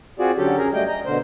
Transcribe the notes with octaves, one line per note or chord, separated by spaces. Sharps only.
C4 F4 F#4 G#4 D5
D3 F#3 C#4 G4 A4
F#2 G#4 A#4 A#5
G3 A3 D#5 G5
D#5 A#5
B2 D3 C5